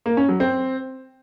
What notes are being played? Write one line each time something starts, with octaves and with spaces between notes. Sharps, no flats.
A#3
C#4
F#3
C4